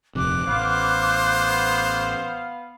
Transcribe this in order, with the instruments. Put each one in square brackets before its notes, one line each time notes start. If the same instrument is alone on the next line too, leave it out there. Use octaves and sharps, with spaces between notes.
[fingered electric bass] D#1 F2 C3 [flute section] D6 F#6
[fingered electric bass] A1 [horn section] B3 F5 [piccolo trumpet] C5